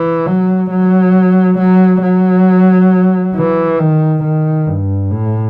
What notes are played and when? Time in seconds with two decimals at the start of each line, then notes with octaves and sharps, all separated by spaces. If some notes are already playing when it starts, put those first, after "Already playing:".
Already playing: E3
0.27 F#3
0.70 F#3
1.58 F#3
2.03 F#3
3.35 E3
3.79 D#3
4.23 D#3
4.66 G2
5.11 A2